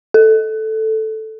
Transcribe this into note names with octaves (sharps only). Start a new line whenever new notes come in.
A4